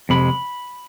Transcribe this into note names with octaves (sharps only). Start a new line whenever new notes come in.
F2 C3 G#3 B5